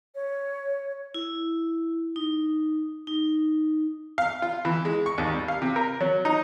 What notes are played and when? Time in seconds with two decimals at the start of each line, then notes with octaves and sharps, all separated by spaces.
0.15 C#5
1.14 E4
2.16 D#4
3.07 D#4
4.18 F5
4.42 F4
4.65 E3
4.85 G#3
5.06 C#6
5.18 D#2
5.34 G3
5.48 F5
5.62 C3
5.76 A#4
6.01 F#3
6.25 D#4